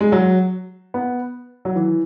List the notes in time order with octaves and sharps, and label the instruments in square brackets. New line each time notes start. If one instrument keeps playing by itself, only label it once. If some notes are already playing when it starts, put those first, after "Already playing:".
[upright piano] G#3
F#3
B3
F#3
E3